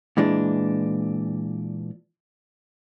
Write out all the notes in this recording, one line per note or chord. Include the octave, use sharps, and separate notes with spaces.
A#2 E3 G#3 D4